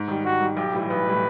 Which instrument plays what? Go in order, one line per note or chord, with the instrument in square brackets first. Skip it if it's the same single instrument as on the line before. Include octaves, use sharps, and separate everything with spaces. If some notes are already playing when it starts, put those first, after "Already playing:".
Already playing: [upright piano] G#2
D#3 G3
[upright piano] G#2 [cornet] F#4
[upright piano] D#3 G3
[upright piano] B1 [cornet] G4
[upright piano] A2 E3 G3
[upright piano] B1 [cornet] B4
[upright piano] A2 E3 G3